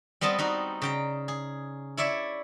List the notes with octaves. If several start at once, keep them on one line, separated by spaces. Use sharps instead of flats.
G3 B3 C4 D#5 A5
G3 D#4 F#4
C#3 G5 A#5
G#4
E4 C#5 D5 E5